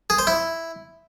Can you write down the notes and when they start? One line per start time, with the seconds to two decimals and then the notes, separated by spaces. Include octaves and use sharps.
0.10 G#4
0.18 C5
0.27 E4